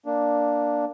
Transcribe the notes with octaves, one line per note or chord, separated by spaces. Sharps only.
A#3 D4